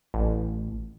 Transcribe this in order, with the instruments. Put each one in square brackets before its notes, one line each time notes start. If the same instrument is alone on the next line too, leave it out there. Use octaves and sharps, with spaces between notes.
[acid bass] A1